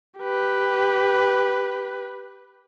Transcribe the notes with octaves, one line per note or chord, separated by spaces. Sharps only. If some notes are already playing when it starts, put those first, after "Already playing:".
G4 B4